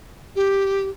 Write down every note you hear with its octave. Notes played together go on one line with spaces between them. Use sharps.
G4